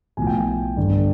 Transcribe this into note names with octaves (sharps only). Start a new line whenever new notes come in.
B1 A2 F3 G#5
G5
G5
G1 G2 D3